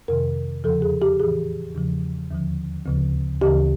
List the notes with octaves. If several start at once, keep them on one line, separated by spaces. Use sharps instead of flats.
F2 C3 D#3 A#4
E2 C#3 F3 A4
G#4
G4
A2 E3 G#4
E2 C#3 F3
D#2 D3 F3
D2 C#3 F3
D2 C#3 E3 G4